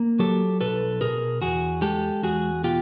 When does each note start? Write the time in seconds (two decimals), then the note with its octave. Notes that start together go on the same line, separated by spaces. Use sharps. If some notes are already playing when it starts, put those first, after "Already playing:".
Already playing: A#3
0.19 F#3 G4 A4
0.61 B1 A4 B4
1.01 B2 G#4 A#4
1.42 E2 F#4 G#4
1.82 G#3 G4 A4
2.23 E2 F#4 G#4
2.64 B2 F4 G4